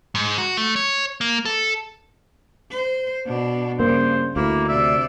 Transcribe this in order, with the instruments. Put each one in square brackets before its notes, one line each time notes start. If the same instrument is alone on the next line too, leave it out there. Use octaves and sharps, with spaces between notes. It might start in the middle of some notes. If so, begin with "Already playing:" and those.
[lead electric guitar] G#2
F#4
A3
C#5
A#3
A4
[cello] C5
B2 D4
[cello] G2 C#3 [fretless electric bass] A#3 [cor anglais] C5
[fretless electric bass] D2 [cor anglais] A#3 [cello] E4
[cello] C3 D5 [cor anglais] E5